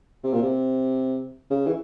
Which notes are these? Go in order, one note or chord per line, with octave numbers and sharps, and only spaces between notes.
C3
A#2
C3
C#3
E3